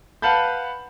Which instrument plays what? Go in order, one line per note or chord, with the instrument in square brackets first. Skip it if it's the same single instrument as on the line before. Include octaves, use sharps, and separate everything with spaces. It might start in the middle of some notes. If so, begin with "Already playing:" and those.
[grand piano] B4 F5 F#5 A5 B5 G6